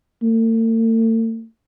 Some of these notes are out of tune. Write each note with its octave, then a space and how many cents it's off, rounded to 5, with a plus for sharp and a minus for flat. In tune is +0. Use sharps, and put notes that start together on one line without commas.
A3 +45